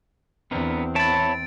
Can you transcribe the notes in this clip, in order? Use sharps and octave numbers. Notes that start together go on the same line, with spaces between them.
E2 B3 C4 D4 A#4
C#5 E5 A5 B5 A6 D7